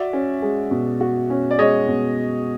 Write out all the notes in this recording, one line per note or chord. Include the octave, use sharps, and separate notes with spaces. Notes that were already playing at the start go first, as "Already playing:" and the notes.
Already playing: F#4 D5 E5
C#4
G#3
B2
F#4
C#4
D5
G#3 C#5 D#5
B2